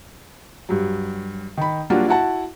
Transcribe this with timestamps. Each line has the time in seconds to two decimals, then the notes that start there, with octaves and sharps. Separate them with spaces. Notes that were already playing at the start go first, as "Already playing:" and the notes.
0.69 G2 F#3
1.57 D#3 B5
1.90 F#3 G3 A#3 D4 F4 F#4
2.08 E4 F#4 F#5 A5